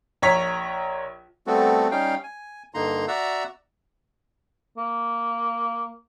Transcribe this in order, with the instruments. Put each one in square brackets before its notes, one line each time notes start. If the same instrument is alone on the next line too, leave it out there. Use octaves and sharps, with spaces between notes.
[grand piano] A#1 C#5 A#5 B6
[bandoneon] G3 A3 B3 C4 F#4 A4
G3 C#4 D#4 F5 G5
G#5
G2 D3 A#3 D#4 A#5 C6
F#4 D5 E5 F#5 A#5 E6
[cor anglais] A#3